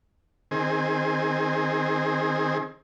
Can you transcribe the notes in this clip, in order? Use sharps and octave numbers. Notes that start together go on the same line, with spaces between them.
D#3 C4 G#4